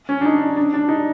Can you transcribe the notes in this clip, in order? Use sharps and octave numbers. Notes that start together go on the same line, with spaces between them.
C#4
D4
D#4
D4
D4
D#4